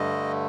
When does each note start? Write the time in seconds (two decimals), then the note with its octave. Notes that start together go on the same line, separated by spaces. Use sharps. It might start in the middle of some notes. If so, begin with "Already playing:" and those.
Already playing: G2 D3 A3 D#5